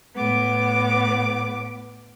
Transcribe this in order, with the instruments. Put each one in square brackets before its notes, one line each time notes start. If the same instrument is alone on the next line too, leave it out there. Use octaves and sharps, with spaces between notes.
[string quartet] A2 B3 D6